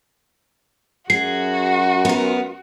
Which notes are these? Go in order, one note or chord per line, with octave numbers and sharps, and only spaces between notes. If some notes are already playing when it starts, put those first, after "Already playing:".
F#2 F#4 G#4 C7
B3 A#4